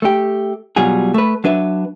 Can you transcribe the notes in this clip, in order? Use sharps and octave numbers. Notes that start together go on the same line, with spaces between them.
A3 G4
B2 F#3 G3 F4 G#4
A3 B4
F#3 D4 B4 E5